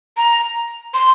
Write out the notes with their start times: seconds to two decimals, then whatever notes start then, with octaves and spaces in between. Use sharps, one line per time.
0.17 A#5
0.94 C6